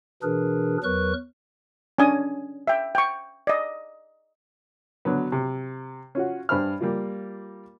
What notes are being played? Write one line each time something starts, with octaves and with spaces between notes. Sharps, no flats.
B2 E3 D4 G#4 A#4 B4
E2 F#3 A#4 B4 C#6 F#6
C#4 D4 G#5 D#6
E5 G5
G5 C#6
D5 D#5
D3 F#3 B3
C3
C#4 F4 F#4
G2 C5 B5 F6
G3 A#3 F4